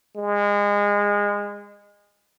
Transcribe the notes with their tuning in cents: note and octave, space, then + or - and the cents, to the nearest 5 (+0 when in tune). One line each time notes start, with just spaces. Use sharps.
G#3 -25